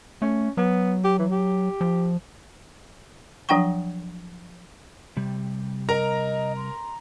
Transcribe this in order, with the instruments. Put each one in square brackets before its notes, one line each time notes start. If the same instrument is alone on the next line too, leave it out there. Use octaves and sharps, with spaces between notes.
[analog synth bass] A3 [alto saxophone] C#4
[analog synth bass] F#3 [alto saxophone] B3
[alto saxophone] G4
E3
G4
[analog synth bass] F3
[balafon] F3 F#3 D4 F#5 G5 C#6
[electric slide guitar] C3 G3
[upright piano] A#4 [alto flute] D#5 [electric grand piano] A#5
[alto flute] C6